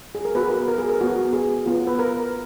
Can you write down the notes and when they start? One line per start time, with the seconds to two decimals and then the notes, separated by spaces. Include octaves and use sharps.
0.15 G#4
0.25 A#4
0.35 B3 F#4 G#4 B4
0.50 A#4
0.68 A#4
0.78 G#4
0.89 A#4
1.01 B3 F#4
1.33 G#4
1.66 B3 F4
1.87 B4
1.99 A#4